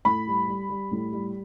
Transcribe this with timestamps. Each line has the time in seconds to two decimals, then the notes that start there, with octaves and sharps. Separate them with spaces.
0.05 A2 B5
0.27 G3
0.48 G3
0.69 G3
0.91 A2
1.12 G3